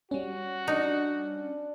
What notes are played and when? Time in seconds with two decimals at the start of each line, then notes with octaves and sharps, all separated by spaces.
0.11 G3 C#4 F#4
0.68 D4 D#4